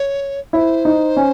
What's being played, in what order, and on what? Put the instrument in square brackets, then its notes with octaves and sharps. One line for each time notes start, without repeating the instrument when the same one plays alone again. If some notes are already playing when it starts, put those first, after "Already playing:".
Already playing: [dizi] C#5
[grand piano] E4 [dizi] C#5
[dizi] C5
[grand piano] D#4
C#4